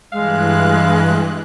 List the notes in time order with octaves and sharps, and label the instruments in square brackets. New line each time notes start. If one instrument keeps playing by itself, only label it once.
[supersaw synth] G2 E3 F#6 [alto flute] G#3 [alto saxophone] F5